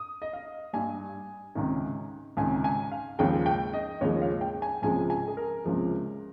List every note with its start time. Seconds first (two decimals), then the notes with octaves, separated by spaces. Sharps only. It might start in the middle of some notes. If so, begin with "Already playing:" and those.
Already playing: D#6
0.22 D#5
0.33 F5
0.73 G2 G3 G#5
1.55 C#2 C3 D#3
2.37 C#2 C3 D#3 G#5
2.64 G#5
2.92 F5
3.19 D#2 C#3 F3 G#3 G5
3.46 G5
3.73 D#5
4.01 D#2 C#3 F3 G#3 C#5
4.22 F5
4.41 G5
4.62 G#5
4.82 C#2 C3 F3 G#3 G#5
5.10 G#5
5.28 G#4
5.37 A#4
5.64 C#2 C3 F3 G#3